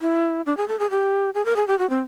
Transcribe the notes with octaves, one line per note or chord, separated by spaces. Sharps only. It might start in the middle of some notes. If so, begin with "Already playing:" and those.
E4
D4
G#4
A4
G#4
G4
G#4
A#4
G#4
G4
F#4
C4